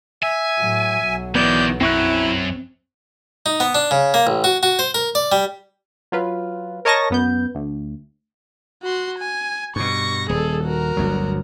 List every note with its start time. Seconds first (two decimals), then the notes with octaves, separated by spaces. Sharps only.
0.23 E5 G#5
0.58 A2 F#3
1.03 B1 F#3
1.35 D#3 E3 G#3 B3 D5 G6
1.81 F#2 C4 E4 C#6 F#6
3.46 D#4
3.60 B3
3.75 D4
3.91 C#3
4.14 A#3
4.27 A1
4.44 F#4
4.63 F#4
4.79 C5
4.95 A#4
5.15 D5
5.32 G3
6.12 F#3 F4 B4
6.85 A#4 C#5 D#5 A5 C#6 A#6
7.10 F#2 B3 G6
7.55 D2
8.83 F#4 C6
9.18 G#5
9.76 G2 B2 C#6 A#6
10.29 D#1 G#4 A4
10.64 F#4 A#4
10.97 G1 D2 F#3